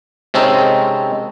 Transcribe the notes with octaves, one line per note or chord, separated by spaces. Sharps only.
C3 G#3 C4 C#4 D#4 A4